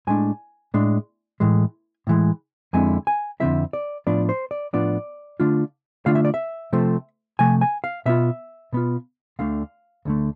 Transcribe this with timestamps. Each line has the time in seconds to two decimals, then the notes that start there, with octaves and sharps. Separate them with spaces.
0.07 A2 G#3 D4 G#5
0.74 A2 G#3 D4
1.40 A2 E3 G#3
2.07 A2 E3 G#3
2.73 F2 D3 G#3 C4 E4 G#5
3.07 G#5
3.40 F2 D3 G#3 C4 E4 E5
3.73 D5
4.07 A2 F3 B3 D4 F4 D5
4.29 C5
4.51 D5
4.73 A2 F3 B3 D4 F4 D5
5.40 D3 A3 D4 F4
6.06 D3 A3 D4 F4 F5
6.15 E5
6.25 D5
6.34 E5
6.73 C3 F3 A3 C4
7.39 C3 F3 A3 G#5
7.61 G#5
7.84 F5
8.06 B2 B3 F4 E5
8.73 B2 B3 F4
9.39 D2 D3 A3 F5
10.05 D2 D3 A3